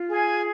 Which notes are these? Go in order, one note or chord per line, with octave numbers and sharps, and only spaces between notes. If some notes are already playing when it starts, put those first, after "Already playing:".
Already playing: F4
G#4 G#5